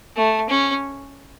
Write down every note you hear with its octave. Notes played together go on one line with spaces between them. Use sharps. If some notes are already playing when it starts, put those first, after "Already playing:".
A3
C#4